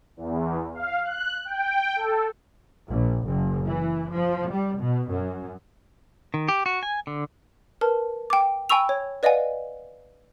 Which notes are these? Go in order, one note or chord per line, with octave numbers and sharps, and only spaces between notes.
E2
F5
F#6
G5
A4
A#1
F#1
E3
F3
G3
B2
F#2
D#3
G4
F#4
G#5
D3
A#4 B4 A5
G5 D6
G5 G#5 B5 C#6 E6 F7
C#5
B4 D5 D#5 F5 F#5 G#5